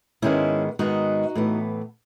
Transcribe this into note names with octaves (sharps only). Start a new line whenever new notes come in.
G#2 D#3 G#3 B3 C#4 E4
G#2 D#3 G#3 B3 D#4 F#4
A2 E3 B3